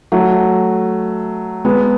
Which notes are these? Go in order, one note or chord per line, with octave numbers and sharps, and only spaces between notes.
F#3 A3
G#3 B3